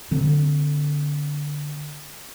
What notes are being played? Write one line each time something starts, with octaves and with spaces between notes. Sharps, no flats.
D3 C4